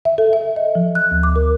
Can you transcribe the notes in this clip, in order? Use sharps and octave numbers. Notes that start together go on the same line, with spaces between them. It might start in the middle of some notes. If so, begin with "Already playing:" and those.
E5
A4
E5
D#5
F3
F#6
D2
D6
A#4